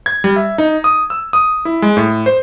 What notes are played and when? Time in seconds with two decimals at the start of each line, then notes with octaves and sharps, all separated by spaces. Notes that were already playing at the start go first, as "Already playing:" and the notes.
0.06 G#6
0.24 G3
0.36 E5
0.58 D#4
0.84 D#6
1.10 E6
1.33 D#6
1.65 E4
1.82 G#3
1.97 A2
2.26 C5